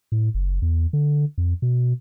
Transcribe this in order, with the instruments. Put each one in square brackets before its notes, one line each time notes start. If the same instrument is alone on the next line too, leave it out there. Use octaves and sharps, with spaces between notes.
[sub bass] A2
F#1
E2
D3
F2
B2